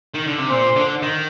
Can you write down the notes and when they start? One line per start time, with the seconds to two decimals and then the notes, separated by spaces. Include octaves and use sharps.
0.14 D#3
0.26 D3
0.39 C3
0.50 A#2 C5
0.76 D3
1.02 D#3